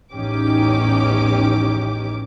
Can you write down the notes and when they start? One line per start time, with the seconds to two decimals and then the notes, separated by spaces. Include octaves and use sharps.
0.14 A1 E2 C#4 D#4 G4 D6